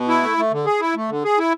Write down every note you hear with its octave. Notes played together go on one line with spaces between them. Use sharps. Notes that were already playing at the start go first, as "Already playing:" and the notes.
Already playing: B2
E4
A3
A3
D3
G#4
E4
A3
D3
G#4
E4